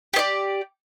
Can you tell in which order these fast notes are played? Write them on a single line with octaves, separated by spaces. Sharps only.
G4 D#5 D5